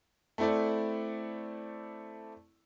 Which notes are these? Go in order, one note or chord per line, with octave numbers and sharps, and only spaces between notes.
A3 C4 E4 A4 D5